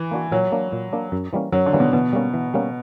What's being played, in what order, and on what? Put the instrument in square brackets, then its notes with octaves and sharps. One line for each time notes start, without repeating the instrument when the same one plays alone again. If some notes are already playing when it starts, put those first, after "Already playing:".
Already playing: [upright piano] E3
[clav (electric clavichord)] A#3 D4 F#4
[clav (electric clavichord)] A#2 [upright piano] F#3
[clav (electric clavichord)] A#3 D4
A#2
A#3 D4
F#2
E3 G3 A#3 C#4
[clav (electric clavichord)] F#2 [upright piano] F#3
[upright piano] D3
[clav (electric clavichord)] E3 G3 A#3 C#4
[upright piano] B2
[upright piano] B2 [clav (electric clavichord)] E3
[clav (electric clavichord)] G3 A#3 C#4
E3
G3 A#3 C#4